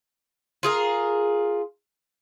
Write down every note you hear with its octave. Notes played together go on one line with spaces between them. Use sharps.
F4 G#4 A#4